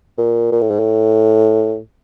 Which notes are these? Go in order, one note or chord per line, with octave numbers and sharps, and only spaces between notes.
A#2
A#2
A2
G#2
A2